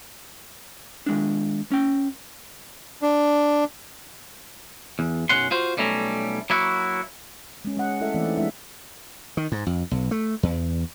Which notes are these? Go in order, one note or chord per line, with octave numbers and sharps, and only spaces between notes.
D#3 G#3 D4
C#4 G5
D4
E2
B1 F#2 G#3 C#4 F#5 C6
F4 F#4 C5
B1 G3 A3 C#4 A#5
F#3 A#3 E4 F#4
G#3 C#4
G#3 C#4 D#5 F#5
A3 E4 A4 E5
E3 A3 C4 D5
D#4
G3 G#3 C4 D4 E4 E5
D#3
G#2
F2
B1
A3
E2